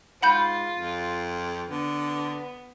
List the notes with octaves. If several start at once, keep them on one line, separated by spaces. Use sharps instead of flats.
G#2 F4 F#5 B5 G6
F2
D3 B3